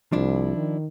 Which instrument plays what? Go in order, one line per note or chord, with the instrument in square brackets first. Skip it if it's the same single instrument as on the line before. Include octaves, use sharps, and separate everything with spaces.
[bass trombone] C2 [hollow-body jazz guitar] F3 D4 E4
[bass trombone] D#3